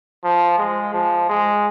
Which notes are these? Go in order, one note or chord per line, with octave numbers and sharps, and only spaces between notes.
F3
G#3
F3
G#3